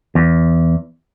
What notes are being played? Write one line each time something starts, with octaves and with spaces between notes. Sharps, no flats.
E2